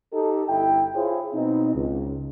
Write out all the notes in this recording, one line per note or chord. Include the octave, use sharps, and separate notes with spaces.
D#4 G4 A4
G1 E4 G5
E4 F4 G#4 C5 C#5
B2 C4 D#4
C#2